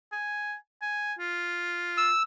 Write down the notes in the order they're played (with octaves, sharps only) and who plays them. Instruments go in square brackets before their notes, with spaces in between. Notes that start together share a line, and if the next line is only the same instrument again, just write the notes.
[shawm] G#5
G#5
F4
[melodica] E6